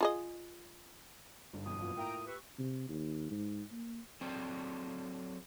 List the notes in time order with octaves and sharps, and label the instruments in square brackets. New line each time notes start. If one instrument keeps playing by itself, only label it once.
[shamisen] F4 G#4 D#5
[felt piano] G1 [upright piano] G#2
[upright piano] F2 B2 E3 [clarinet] D#6
[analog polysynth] F#2 A#2 B3 [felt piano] F4
[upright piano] A2 A#3 E4 [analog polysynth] G5 A#5 D7
[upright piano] G4 [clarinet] B4 [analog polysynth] C#6 E6
[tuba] C3
D#2
G#2
A#3
[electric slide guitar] F#3 C4 A4 C5 D5